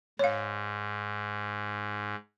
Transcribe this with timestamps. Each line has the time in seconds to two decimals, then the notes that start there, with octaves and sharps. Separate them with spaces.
0.19 G#2 C#5 F5